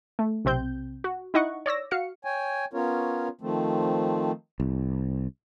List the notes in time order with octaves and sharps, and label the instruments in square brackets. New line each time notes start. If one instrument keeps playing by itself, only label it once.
[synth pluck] A3
B1 C3 C4 G6
F#4
D#4 E4 D#5 F#5 C#6
C#5 D5 E6 A#6
F#4 F5 C#7
[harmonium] C#5 G5 G#5
B3 C#4 F4 A#4 C#5
D#3 F3 A3 C4
[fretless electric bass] C2